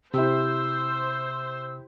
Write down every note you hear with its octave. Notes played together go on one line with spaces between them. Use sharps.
C3 E4 G4 C5 E6